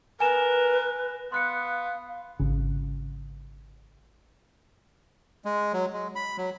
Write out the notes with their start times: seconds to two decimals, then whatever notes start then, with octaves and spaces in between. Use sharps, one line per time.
0.20 A#4 B4 G#5 E7
1.32 B3 F5 C6 F#6 C#7
2.39 G#1 C#3
5.45 G#3
5.73 F#3
5.93 G#3
6.15 B5
6.38 F#3